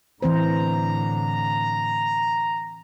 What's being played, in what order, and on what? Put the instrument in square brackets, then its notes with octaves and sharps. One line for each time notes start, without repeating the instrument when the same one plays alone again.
[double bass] A2 D3 [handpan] E3 C4 C5 [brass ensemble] A#5